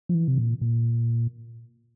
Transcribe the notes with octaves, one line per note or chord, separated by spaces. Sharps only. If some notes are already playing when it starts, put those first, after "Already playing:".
F3
E3
C3
A#2
A#2